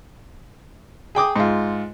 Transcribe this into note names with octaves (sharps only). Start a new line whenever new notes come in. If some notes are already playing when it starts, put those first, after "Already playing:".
G#4 G5 D6 D#6
G#2 F4